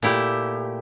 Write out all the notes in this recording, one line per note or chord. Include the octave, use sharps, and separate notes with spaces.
A#2 A3 E4 G4